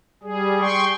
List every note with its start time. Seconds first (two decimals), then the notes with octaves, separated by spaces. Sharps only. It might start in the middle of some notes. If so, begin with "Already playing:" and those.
0.23 G3 G#4
0.61 G5 C6 C#6